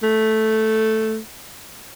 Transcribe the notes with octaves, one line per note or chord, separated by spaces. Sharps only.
A3